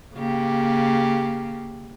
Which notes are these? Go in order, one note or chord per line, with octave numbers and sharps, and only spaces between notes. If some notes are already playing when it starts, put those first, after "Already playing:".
C#3 A#3 G4